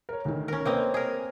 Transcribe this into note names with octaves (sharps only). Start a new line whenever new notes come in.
A#4 C#5
D2 D#3
C#4 A#4
A#3 C4 B4 C#5 D#5
G#4 A#4